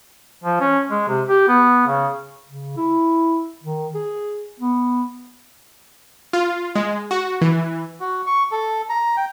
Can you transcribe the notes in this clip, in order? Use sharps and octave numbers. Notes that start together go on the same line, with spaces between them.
F3
C#4
G#3
C3
G4
B3
C#3
C#3
E4
D#3
G#4
B3
F4
G#3
F#4
E3
F#4
C#6
A4
A#5
G5